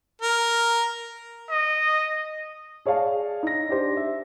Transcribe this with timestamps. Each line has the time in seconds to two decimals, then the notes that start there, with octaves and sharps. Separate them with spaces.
0.21 A#4
1.50 D#5
2.86 G#4 C#5 D5 F5 A5
3.43 D#4 A#6
3.69 D4 G4 C5
3.97 E5